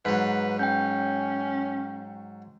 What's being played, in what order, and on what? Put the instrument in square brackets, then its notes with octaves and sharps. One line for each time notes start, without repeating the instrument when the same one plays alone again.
[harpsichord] G#2 F#3 [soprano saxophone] B4
[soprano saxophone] C#4 [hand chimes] G5 G6